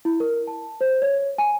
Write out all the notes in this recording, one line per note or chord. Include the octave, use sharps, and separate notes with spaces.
E4
A#4
A5
C5
C#5
G#5